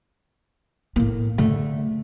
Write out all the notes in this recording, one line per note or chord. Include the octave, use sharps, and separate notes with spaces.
A2 A#3
D3 A3